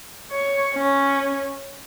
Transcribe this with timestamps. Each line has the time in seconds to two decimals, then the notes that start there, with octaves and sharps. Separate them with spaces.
0.31 C#5
0.74 C#4